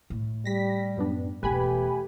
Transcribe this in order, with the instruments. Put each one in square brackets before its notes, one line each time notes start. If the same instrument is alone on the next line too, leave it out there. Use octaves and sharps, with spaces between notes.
[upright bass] A2
[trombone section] G3 [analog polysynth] A#6 B6
[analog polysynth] F#2 B3 D4
[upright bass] E1 E3 [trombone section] A3 G4 [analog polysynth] B4 G#5 B5